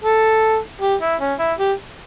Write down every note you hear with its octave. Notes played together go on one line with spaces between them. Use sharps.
A4
G4
E4
C#4
E4
G4